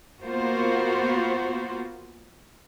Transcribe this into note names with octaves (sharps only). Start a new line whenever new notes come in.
A#3 B3 F4 F#4 C5